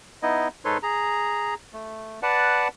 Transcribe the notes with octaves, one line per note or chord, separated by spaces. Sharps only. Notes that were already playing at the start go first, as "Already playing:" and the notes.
B3 D#4 E4 D#5
G#2 D#4 A4 B4 C#5 C6
G#4 A#5
A3
B4 D5 F#5 A5